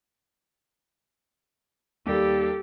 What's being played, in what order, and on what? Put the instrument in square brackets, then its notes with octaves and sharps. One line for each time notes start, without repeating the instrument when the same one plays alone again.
[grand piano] D#2 G3 [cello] G4 A4